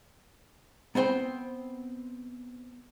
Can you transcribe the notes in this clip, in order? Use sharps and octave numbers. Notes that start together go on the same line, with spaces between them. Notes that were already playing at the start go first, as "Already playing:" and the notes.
B3 C4 C5 G5